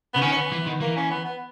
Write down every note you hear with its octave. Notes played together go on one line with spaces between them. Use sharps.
C#3 B3
D#3 C#4
C#4
B3
E3
D#3
E3 A#3
C#4
B3
B3